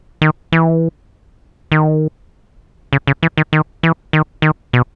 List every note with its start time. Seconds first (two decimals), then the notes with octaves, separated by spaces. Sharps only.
0.22 D#3
0.52 E3
1.72 D#3
2.93 C#3
3.07 C#3
3.23 E3
3.38 D#3
3.53 D#3
3.83 E3
4.13 D#3
4.42 D#3
4.73 B2